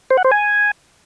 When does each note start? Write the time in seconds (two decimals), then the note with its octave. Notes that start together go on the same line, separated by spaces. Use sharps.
0.10 C5
0.17 F#5
0.25 C5
0.32 G#5